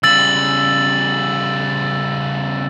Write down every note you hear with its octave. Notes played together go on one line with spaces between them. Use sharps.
C#3 G3 E6 A6 F#7